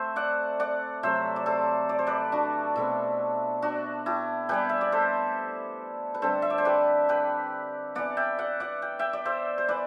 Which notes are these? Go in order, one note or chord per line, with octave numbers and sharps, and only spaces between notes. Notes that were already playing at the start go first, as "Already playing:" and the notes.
Already playing: A3 C4 C5 E5
D5 F#5
D5 F#5
C3 F#3 A3 C5 E5
D5
A4 C5
D5
C5
B4 D5
D4 F#4
B2 A3 C4 E4
D4 F#4
E4 G4
E3 G3 B3 G4 B4
E5
D5
A4 C5
B4
D3 G3 C4 A4 C5
E5
D5
C5
G4 B4
G4 B4
E3 B3 D5 F#5
E5 G5
D5 F#5
D5 F#5
G5
E5 G5
D5
C5 E5
C5
E3 B3 B4 D5